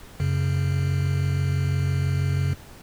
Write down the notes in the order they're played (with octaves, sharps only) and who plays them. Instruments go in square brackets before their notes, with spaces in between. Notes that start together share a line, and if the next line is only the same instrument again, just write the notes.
[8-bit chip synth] F#2 C#3